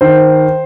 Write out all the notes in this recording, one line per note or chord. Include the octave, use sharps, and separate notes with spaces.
D#3 C5